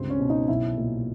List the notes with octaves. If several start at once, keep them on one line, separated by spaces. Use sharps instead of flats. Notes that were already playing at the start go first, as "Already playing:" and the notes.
Already playing: C#2 G2 D3 C4 C5
C#4 C#5
B2
D#4 D#5
B1 E4 E5
A#2